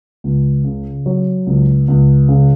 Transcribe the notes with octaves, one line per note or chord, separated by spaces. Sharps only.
C#2
C#3
F#3
C#2
C#2
C#3